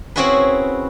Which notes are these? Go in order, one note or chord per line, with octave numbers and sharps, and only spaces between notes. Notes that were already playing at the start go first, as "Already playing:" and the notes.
C4 C#4 E4 F#4 G#4 B4